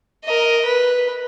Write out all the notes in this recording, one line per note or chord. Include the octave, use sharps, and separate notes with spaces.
A#4 D#5
B4